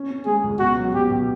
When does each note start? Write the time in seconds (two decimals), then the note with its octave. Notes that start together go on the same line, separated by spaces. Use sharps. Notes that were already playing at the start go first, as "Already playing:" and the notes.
Already playing: C#4
0.10 C#4
0.26 G#3 G#4
0.44 C#2
0.59 B2 F#4
0.77 F#3
0.93 B2 G4
1.10 B2